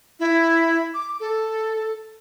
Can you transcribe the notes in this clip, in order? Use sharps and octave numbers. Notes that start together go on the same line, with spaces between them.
E4
D6
A4